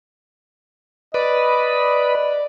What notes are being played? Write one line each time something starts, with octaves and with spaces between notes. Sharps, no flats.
B4 D5 D#5